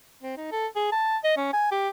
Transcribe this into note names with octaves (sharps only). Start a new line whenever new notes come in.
C4
D#4
A4
G#4
A5
D#5
C#4
G#5
G4